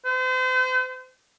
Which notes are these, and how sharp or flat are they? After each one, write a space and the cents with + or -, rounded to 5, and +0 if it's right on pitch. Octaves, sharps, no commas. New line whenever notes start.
C5 -40